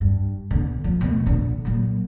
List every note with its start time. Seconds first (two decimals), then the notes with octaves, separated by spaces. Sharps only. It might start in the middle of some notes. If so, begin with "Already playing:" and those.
0.01 G2
0.51 B2 D3
0.84 F3
1.01 B2 A3
1.26 A#1 D3
1.65 A#2 F#3